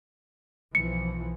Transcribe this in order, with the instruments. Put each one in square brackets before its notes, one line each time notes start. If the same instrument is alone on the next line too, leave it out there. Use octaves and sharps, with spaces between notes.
[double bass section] B1 E3 F3 [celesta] C#7